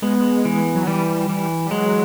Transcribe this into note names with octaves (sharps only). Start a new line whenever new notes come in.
G#3 B3
E3
F#3
E3 G3
E3
G3
F#3 G#3